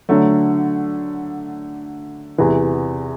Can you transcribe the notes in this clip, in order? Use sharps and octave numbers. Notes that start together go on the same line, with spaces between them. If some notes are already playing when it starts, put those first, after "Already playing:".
D3 F#3 A3
E2 C3 E3